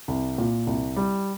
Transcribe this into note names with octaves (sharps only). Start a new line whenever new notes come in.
C2
A#2
C2
G3